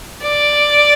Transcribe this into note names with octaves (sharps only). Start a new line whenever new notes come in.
D5